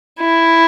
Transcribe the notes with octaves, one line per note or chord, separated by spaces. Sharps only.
E4